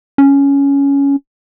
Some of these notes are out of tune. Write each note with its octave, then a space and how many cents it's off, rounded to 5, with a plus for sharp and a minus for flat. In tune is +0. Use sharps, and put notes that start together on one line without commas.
C#4 +10